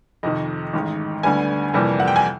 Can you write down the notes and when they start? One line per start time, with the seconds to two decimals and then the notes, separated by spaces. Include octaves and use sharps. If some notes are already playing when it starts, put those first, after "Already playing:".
0.23 F2 C3 D#3 D#5
0.73 A1 G#2 D#3
1.23 D2 D3 G3 B3 G#5
1.74 F2 C3 E3 G3 A#3
2.00 F#5
2.08 G5
2.16 G#5